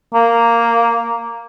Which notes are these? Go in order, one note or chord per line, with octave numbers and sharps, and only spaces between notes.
A#3